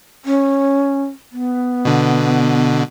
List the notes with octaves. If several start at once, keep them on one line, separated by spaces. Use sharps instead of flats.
C#4
B3
B2 D3